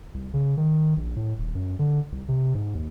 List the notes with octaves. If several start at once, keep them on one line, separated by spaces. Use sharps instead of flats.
C2
C#3
D#3
A#1
A2
D#1
F#2
D3
C2
C3
G#2
D#2